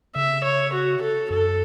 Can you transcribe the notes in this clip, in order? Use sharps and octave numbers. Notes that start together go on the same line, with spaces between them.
C#3 E5
C#5
F#4
A4
F#2 A4